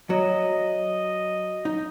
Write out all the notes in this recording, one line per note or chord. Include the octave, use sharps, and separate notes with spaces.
F#3 D#5
D#4